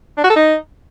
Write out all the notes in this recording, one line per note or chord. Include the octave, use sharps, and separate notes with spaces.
D4
F#4
A4
D#4